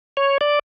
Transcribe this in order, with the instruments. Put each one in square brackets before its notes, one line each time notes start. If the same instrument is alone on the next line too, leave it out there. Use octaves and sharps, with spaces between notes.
[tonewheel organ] C#5
D5